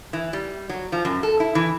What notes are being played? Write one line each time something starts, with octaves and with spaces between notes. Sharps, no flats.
E3
G3
F#3
F3
F#2
A4
E4
E3